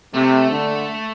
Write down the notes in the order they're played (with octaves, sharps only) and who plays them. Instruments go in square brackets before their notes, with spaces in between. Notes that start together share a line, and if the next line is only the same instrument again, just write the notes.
[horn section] C3 [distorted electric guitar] A3
[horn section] D3